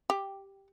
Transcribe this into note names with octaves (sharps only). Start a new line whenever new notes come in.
G4